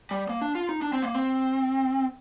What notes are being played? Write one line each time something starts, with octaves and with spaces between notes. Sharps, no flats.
G3
A#3
D4
F4
D#4
D4
C4
A#3
C4